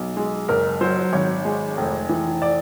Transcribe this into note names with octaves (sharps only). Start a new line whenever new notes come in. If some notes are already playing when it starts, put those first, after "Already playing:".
Already playing: B1
G#3
F#1 A#4
F#3 C5
G#1 C#5
G#3
F1
E3
D5